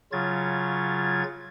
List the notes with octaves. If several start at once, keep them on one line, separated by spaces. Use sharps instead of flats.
C#3 F#3 F4 G#6 A6